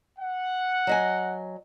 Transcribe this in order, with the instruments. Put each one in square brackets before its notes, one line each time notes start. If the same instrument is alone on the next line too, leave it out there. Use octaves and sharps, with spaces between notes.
[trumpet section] F#5
[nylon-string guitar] F#3 D#5 G#5